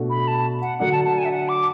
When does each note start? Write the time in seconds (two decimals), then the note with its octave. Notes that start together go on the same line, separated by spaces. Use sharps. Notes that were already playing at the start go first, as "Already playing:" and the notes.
Already playing: B2 A3 D4 F#4
0.10 B5
0.28 A5
0.62 F#5
0.79 D3 F#3 A3 D4 F#5
0.92 A5
1.04 A5
1.18 G#5
1.25 E5
1.31 F#5
1.48 D6